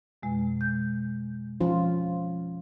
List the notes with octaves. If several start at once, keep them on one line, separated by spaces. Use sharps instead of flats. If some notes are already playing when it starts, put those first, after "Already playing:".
F2 B2 G#3
G6
F3 C#4 F4